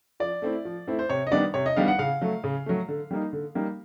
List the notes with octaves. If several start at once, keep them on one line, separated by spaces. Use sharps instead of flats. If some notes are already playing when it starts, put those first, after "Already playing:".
F3 D5
A3 C4 E4
F3
A3 C4 E4
C5
C3 C#5
D#5
D#3 G3 B3 D4 D5
C3 C#5
D#5
D#3 G3 B3 D4 F5
F#5
C#3 F5
F#3 A3
C#3
F#3 A3
D3
G3 A#3 D#4
D3
G3 A#3 D#4